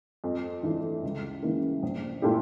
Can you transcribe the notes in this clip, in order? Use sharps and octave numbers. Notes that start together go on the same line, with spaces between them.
F2
E3 A3 D4
C#2
C#3 E3 A#3
A#1
A#2 A3 E4 G4